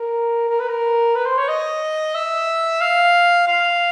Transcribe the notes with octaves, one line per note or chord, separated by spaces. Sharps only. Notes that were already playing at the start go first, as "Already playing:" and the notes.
Already playing: A#4
A#4
B4
A#4
B4
C5
C#5
D#5
E5
F5
F5